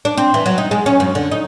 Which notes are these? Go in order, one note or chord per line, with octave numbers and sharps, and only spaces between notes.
D4
C4
E3
F#3
D#4
G#3
C#4
F#2
D3
D#4